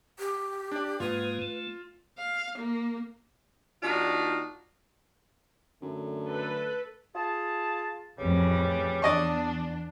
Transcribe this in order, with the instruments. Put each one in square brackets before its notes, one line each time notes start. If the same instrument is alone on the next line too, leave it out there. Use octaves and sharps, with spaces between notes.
[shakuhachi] G4
[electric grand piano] D4 D5
[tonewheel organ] G#2 G#3 A#3 [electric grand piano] F4 [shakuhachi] B4
[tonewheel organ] A3
[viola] F5
A#3
[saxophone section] D#2 D4 D#4 F4 F#4 D5
[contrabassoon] F#2 [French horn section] D3 A3
[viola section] A4 B4
[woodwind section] F4 G#4 A5
[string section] A1 F2 A2 [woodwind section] C#3 E3 G3
[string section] E2 D4 [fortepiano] D5 D#5 C#6